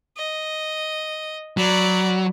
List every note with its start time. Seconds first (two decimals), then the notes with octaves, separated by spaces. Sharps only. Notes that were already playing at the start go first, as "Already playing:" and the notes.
0.17 D#5
1.57 F#3 D5 B5